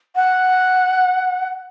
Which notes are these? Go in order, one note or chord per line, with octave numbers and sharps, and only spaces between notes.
F#5